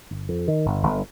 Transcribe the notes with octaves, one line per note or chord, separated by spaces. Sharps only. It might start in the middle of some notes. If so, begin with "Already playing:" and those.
G1
F2
D#3
G1
G1